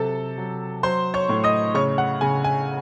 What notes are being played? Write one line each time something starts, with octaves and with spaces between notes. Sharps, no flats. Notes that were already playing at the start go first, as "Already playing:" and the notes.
Already playing: C3 F#3 A4 A5
F#3
F#3 C5 C6
C#5 C#6
A2
D#5 D#6
C#3 C#5 C#6
F#5
C#3 G#5
G#5